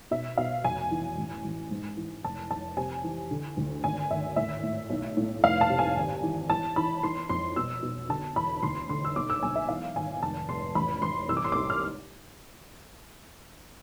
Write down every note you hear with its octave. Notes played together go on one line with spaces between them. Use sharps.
B2 E5
B2 F5
F1 G#5
E3
A1
A1
G#2
E3
F1 A5
F1 A5
C3 G#5
E3
D3
D2
G#1 G#5
G#1 E5
A2 E5
A2
B1
A2
F1 F5
A5
C3
G#5
G#1
E3
E3 A5
E3 B5
E3 C6
F2 C6
B2 E6
B2
D3 A5
E2 B5
D2 C6
D3 C6
E6
B1 D6
E6
B1 G#5
E5
E3 F5
G#1 G#5
F1 A5
F1 C6
A1 B5
A1 C6
C2 E6
D6
C6
C2 D6
F6